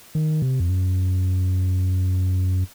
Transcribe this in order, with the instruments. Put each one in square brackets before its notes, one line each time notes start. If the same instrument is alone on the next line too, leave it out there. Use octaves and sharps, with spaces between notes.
[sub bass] D#3
C3
F2
F#2